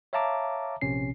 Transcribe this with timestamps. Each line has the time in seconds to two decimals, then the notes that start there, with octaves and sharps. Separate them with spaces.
0.13 C#5 E5 F5 A5 A#5 D6
0.81 A#1 C3 C#4 C7